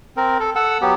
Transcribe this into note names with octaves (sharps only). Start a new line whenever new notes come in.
C4 A#4
A4
A4 F#5 E6
F#3 B3 G4